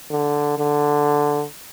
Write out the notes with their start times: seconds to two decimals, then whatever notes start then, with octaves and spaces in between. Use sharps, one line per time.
0.10 D3
0.58 D3